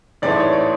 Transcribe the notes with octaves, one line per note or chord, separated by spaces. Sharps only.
A1 G#2 E3 A3 D5
C#5
D5